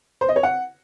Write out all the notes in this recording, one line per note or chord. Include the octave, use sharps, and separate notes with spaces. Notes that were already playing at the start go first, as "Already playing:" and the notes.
C5
D#5
C#5
F#5